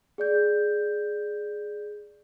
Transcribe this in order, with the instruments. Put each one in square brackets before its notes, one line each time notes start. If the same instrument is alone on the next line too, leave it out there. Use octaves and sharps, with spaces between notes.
[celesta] G#4 D5 G6